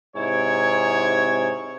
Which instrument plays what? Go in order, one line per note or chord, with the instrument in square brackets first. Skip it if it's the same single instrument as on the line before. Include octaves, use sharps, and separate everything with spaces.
[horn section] G#2 C3 E4 C#5